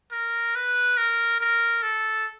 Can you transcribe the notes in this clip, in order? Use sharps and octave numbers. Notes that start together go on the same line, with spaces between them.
A#4
B4
A#4
A#4
A4